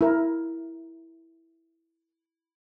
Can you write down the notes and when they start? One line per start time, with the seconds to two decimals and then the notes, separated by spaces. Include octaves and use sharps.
0.01 E4 A#4